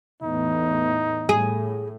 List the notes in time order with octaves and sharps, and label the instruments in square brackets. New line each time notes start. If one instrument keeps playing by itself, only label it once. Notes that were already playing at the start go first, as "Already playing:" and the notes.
[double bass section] E2 A2 [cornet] D#4
[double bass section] A2 [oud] G#4